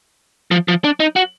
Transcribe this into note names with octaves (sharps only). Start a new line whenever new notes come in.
F3
F3
D4
D#4
F#4